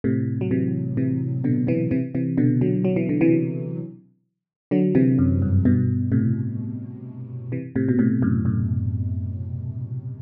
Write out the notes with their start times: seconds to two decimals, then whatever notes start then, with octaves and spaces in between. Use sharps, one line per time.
0.04 A2 C3
0.41 F#3
0.51 C3 E3
0.97 C3 E3
1.44 B2 D3
1.67 C3 E3
1.91 C3 E3
2.15 C3 E3
2.38 B2 D3
2.61 D3 F#3
2.85 F#3
2.96 E3
3.09 D3
3.21 C3 E3
4.71 D3 F#3
4.95 C3 E3
5.18 F#2
5.42 G2
5.65 G2 B2
6.12 A2 C3
7.52 C3 E3
7.76 A2 C3
7.89 B2
7.99 A2 C3
8.22 F#2 A2
8.45 F#2 A2